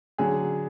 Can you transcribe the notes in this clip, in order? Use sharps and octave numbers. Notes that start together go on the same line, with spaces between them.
D3 F#3 G#4